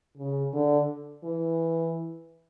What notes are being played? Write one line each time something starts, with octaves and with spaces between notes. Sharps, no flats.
C#3
D3
E3